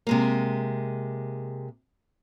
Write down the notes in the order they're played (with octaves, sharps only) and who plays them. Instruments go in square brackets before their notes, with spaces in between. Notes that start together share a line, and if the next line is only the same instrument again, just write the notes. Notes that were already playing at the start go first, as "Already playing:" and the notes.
[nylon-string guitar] C3 G#3 A#3